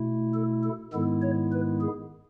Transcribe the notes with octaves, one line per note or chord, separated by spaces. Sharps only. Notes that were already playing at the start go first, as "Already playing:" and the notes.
Already playing: B2 A3 E4
A4
A4
G#2 D#3 G#3 B3 E4 A4
C#5
B4
G#4